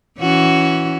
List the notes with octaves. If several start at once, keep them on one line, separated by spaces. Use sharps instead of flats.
E3 C#4 F#4